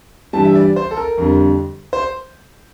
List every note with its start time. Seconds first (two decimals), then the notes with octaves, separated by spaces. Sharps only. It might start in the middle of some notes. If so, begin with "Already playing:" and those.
0.33 G2 E3 G3 A5
0.44 E5
0.55 D5
0.76 C5
0.91 A4
0.97 A#4
1.18 F2 D3 G3
1.93 C5